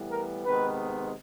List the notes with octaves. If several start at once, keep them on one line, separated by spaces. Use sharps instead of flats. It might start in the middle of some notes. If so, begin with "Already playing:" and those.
Already playing: A2 E3 G3 B3
A#4
C3 D#3 G#3 B3 B4